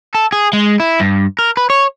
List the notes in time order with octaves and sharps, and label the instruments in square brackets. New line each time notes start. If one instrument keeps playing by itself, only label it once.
[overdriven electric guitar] A4
G#4
G#3
E4
G2
A#4
B4
C#5